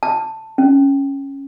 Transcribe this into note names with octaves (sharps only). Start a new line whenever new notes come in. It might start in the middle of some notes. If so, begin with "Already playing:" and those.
A5
C#4